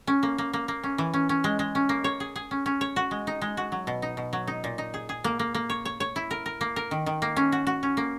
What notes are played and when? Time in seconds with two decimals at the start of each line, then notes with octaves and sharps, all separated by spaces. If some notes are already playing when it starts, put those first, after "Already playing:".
0.07 C#4
0.23 A#3
0.38 A#3
0.53 A#3
0.68 A#3
0.83 C#4
0.98 E3
1.14 C#4
1.29 C#4
1.44 G#3
1.59 G#3
1.75 C#4
1.89 A#3
2.04 C#5
2.20 G#4
2.36 G#4
2.51 C#4
2.66 C#4
2.81 C#5
2.96 F#4
3.11 G#3
3.27 D#4
3.42 G#3
3.57 F#4
3.72 F#3
3.87 B2
4.02 D#4
4.17 B2
4.33 F#3
4.47 D#4
4.64 A#2
4.78 D#4
4.94 G#4
5.09 G#4
5.24 A#3
5.39 A#3
5.54 A#3
5.70 C#5
5.85 C#5
6.00 C#5
6.16 E4
6.31 A#4
6.46 A#4
6.61 A#3
6.76 A#4
6.91 D#3
7.06 D#3
7.22 A#3
7.36 C#4
7.52 F#4
7.67 F#4
7.83 C#4
7.97 A#3